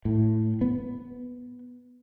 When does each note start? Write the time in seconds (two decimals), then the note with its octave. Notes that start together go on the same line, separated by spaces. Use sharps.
0.05 A2
0.61 B3